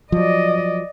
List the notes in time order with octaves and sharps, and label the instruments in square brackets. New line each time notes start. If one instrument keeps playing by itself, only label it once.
[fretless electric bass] F3 F#3 [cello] D5 D#5